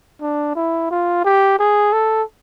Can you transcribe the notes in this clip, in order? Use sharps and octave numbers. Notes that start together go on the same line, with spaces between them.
D4
E4
F4
G4
G#4
A4